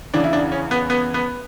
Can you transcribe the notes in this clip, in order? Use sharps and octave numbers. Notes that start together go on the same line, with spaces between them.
E2 C#3 E3 D4
E4
D4
C#4
B3
B3
B3